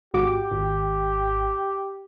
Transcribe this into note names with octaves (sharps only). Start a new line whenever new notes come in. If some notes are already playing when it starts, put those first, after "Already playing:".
G#1 F#4 G4 D6
G#1